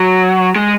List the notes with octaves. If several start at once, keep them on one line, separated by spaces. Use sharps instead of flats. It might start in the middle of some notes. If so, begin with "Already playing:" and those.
Already playing: F#3
G#3